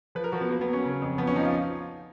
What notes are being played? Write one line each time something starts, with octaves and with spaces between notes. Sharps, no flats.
F3 B4
A#4
F3 F#4
B3
F#3 A#3
B3
F#3
C#4
C#3
F2
F3 B3
C#4
F3 D#4
F4